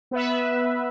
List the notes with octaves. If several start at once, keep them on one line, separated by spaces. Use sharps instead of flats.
B3 B4 E5